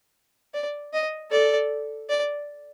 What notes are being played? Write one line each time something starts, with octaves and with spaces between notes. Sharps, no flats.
D5
D#5
A4 D5
D5